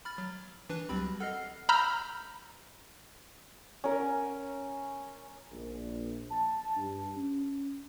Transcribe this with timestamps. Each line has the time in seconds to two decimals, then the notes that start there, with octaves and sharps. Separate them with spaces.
0.05 B5 F6 A6
0.18 F#3
0.70 E3 D4 B4
0.89 C#2 F#3 G3 C4 B5
1.20 A4 D#5 F#5 F6 C7
1.69 A#5 B5 E6 F6 G6
3.84 C#4 A#4
5.51 A#1
6.31 A5
6.76 G2
7.17 C#4